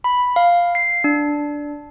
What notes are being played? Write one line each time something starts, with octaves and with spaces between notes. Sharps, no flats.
B5
F5
C7
D4